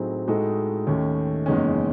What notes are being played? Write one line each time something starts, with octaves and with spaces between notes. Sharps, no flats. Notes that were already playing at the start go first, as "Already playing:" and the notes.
Already playing: A2 F#3 C4 D#4 G#4
A2 G#3 D#4 F#4 A4
D#2 D#3 A3 C#4
F#1 E2 D#3 G#3 C#4